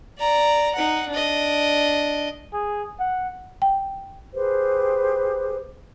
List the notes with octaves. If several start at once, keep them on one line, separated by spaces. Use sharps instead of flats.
D5 A#5
D#4 F#5
D4 D#5
G#4
F#5
G5
G4 G#4 B4 C5